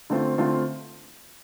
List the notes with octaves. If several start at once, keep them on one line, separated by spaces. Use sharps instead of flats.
D3 A3 C4 F4
D3 A3 C4 F4